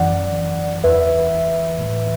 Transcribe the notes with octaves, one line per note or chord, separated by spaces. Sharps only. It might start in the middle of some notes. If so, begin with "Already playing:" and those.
Already playing: F#2 E3 D5 F#5
E2 E3 B4 E5
A2 E3